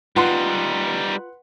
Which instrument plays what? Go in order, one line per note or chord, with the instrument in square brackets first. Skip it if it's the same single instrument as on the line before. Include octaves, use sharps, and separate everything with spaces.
[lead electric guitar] G3 D#4 [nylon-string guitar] F4 [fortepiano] B4 F#5 C6